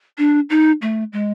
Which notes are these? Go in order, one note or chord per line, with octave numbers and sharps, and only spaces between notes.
D4
D#4
A3
G#3